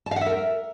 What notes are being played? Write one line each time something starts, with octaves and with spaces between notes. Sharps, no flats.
A5
F5
F#5
E5
A#4